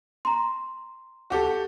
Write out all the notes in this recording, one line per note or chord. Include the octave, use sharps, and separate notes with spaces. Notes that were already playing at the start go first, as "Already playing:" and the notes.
A#5 C6
F#4 G4 A4